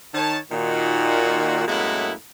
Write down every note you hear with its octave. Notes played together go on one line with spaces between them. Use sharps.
D#3 C#5 A5
A#2 D#3 F#4
F#2 A2 G#3 A#3 B3 E4